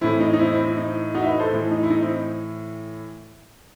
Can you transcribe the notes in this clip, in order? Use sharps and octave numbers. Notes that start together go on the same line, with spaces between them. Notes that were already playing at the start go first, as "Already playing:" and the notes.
A2 E3 C4 E4
D#4
D#4
C4 E4
C4 E4
C4 E4
D#4
D#4 F#4
E5
B4 D#5
A4 C5
A2 E3
D#4
E4
D#4
C4 E4